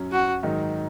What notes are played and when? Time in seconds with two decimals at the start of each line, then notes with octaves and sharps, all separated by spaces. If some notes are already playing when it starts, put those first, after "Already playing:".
Already playing: F#2 F#3 C#4
0.12 F#4
0.43 G#2 D#3 F#3 D#4